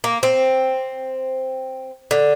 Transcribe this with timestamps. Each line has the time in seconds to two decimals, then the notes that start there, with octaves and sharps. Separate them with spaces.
0.04 A#3
0.23 C4
2.11 D3